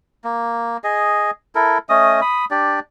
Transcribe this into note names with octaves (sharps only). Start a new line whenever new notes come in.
A#3
G#4 D#5
E4 A4 A#4
A3 C#4 D#5 D#6
B5 D#6
D4 G4 D5